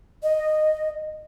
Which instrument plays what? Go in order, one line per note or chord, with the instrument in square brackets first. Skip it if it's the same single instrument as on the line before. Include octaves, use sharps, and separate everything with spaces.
[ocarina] D#5